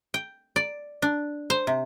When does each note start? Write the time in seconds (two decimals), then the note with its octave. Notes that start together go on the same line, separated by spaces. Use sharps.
0.14 G5
0.56 D5
1.02 D4
1.50 C5
1.67 C3